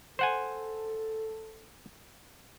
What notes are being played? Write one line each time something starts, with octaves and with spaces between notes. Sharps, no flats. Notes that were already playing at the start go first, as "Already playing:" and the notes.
A4 C5 F#5 G#5